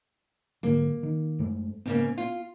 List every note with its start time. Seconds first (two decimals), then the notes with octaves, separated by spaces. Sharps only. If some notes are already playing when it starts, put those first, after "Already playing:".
0.63 G#2 D3 F#3 A#3
1.03 D#3
1.39 F#2 G#3 A3
1.86 G#2 C#3 A#3 B3
2.18 F4